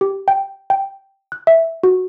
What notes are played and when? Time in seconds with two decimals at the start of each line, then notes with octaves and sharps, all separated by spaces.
0.01 G4
0.28 G5
0.70 G5
1.32 F#6
1.47 E5
1.84 F#4